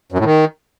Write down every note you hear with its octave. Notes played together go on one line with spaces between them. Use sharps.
F#2
A2
D#3